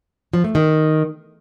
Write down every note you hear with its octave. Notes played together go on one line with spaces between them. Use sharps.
F3
A3
D#3